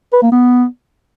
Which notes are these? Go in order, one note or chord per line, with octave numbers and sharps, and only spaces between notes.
B4
A#3
B3